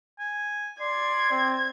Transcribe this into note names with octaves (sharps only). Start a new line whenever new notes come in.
G#5
D5 C6 G#6
C4